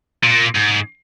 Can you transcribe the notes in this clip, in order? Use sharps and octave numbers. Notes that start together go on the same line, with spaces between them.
A#2
G#2